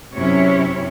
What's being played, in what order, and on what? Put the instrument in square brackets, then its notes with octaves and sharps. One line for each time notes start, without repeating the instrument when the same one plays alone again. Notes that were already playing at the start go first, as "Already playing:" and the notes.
[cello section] F#2 C3 C#4 E4 C#5